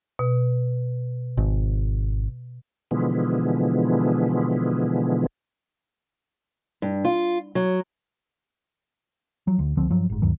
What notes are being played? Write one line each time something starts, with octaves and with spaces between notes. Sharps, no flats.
B2
G#1
B2 D3 E3 F3 G#3 B3
G2
F4
F#3
F3 F#3
D2
C#2 D3 F3 C4
G2 F3 F#3
G1 G#2
D2 G2 D#3 F#3